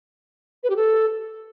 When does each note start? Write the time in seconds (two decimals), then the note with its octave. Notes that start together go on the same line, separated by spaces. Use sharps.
0.64 B4
0.70 G4
0.76 A4